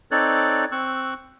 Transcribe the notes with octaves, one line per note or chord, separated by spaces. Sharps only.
C4 D#4 A4 C#5 D5 F#6
C4 C#6 E6 F#6